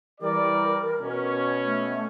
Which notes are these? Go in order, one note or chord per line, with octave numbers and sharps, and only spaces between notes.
E3 G3 A#4 D5
B2 C#4
A3